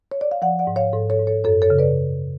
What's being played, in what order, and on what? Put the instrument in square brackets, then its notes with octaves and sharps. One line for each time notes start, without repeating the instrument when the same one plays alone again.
[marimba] C#5
D5
F5
F3 D5 F#5
D5 F#5
G#2
C#5 F5
G#2 A4
A4 C#5
G#2
A4 C#5
F#2 A4 C#5
A4 C#5
C#3
B4 D5